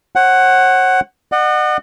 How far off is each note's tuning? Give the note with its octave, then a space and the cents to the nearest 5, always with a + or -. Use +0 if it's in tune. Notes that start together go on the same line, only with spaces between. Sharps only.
C#5 -45 F#5 +10
D#5 -45 F#5 +0